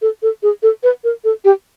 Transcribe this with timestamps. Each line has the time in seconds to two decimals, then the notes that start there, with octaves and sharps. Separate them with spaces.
0.02 A4
0.22 A4
0.43 G#4
0.63 A4
0.83 B4
1.04 A#4
1.24 A4
1.45 G4